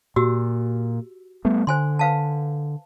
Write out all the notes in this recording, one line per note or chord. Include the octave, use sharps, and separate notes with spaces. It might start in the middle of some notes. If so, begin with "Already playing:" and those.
A#2 F#4 G4 E6
G3 A3 B3
D3 C5 G#5 C6
B4 F5 A5